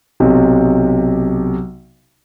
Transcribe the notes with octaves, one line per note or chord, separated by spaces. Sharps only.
B1 C3